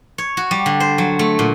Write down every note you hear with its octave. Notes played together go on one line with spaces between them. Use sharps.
C#5
F#4
G3
D3
C5
F#3
A3
A#2